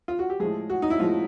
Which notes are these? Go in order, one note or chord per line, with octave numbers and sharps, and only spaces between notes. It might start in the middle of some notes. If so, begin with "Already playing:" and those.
F4
F#4
G4
A2 F3 G#3 G#4
F#4
D#4
E4
A2 F3 G#3 F4